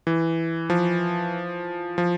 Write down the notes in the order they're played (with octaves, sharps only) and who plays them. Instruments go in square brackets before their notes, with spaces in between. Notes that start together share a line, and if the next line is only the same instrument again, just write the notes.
[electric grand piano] E3
F3
F3